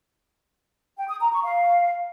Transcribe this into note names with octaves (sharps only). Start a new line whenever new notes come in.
G5
D#6
A#5
C#6
F5